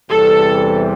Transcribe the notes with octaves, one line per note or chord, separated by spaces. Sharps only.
E2 C3 E3 G3 A4